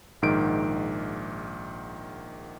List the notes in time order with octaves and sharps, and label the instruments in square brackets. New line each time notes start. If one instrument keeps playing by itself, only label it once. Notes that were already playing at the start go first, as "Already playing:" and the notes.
[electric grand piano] A#1 G#2 D#3 D7